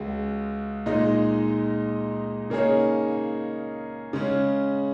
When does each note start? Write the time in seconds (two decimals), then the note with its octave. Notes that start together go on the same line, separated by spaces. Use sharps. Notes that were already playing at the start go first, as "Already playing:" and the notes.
Already playing: C#2 C#3 G#3 F#4
0.86 A#2 G#3 D#4
2.50 C#3 A#3 D#4 G#4 C#5
4.13 C#3 G#3 C#4